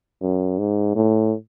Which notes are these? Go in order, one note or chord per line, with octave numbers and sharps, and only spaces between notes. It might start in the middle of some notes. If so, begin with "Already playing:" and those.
F#2
G#2
A2